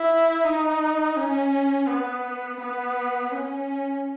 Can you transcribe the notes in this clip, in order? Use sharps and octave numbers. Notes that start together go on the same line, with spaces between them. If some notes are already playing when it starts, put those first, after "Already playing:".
Already playing: E4
D#4
C#4
B3
B3
C#4